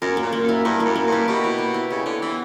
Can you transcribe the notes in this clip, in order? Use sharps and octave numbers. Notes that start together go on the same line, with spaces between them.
F#2 A#4
A#3
A#2
A#3
F#2
E4
G2 A#4
A#3
F#2
A#3
G2
E4
B2 G4
C#5
B3
E4
C#3 G4
D3 C#5
E3 B3